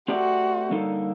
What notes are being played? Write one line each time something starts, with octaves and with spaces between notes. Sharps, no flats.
A3 C4 F#4 G4 D5
D3 G3 A#3 D#4 A4